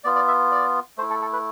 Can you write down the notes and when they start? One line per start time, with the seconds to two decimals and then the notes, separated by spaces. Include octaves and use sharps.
0.04 B3 F4 D5
0.16 D5
0.28 E5
0.52 D5
0.97 A3 C5
1.02 E4
1.10 A4
1.21 A4
1.33 B4